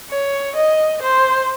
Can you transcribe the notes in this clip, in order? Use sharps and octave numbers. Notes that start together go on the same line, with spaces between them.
C#5
D#5
C5